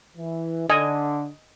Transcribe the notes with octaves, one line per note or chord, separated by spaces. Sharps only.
E3
D3 D#5 G#5